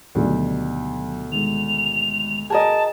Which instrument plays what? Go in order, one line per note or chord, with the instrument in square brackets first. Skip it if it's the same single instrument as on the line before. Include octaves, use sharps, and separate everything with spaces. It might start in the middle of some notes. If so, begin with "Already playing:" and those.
[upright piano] D2 B2 G3 [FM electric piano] D#3 F#3
[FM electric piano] D#3 G#3 [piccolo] F7
[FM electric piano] F#4 [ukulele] G#4 A#4 D#5 [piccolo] A5